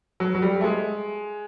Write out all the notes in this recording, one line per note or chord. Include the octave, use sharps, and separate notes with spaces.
F#3
F#3
G3
A3
G#3